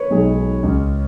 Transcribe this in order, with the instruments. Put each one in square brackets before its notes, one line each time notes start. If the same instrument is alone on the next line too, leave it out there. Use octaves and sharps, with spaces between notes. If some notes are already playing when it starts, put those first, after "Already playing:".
Already playing: [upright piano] B4 C#5
[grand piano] B1 B2 G#3 D#4 G#4
C#2 C#3 G#3 C#4 G#4